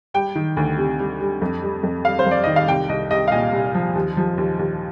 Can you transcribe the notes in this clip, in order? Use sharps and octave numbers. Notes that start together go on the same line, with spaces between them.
G3 G5
D#3
D2
C3
G3
G3
F2
G3
F2
G3 F5
C5
F2 D5
D#3 D#5
F5
C2 G5
C2 D#5
C2 D#5
F5
A#2 D#5
C2
F3
D#2
F3
D#2
D#2